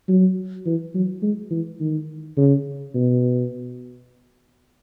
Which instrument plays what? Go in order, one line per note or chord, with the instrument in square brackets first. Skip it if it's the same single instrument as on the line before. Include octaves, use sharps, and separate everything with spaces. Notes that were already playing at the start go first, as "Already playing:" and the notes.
[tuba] F#3
E3
F#3
G#3
E3
D#3
C#3
B2